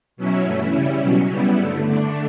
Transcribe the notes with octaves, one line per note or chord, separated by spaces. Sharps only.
B2 F#3 C#4 E4
G2 E3 A3 C#4 E4
C#3 G3 C#4 E4
B2 F#3 C#4
C#3 G3 B3 E4
G2 D3 A3
D3 A3 D4